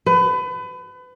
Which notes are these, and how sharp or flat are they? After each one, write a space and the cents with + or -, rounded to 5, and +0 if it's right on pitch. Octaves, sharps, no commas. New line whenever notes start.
B4 +30